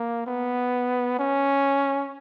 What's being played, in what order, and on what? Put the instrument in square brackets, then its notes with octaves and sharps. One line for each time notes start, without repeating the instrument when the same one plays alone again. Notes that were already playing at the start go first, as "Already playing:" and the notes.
Already playing: [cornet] A#3
B3
C#4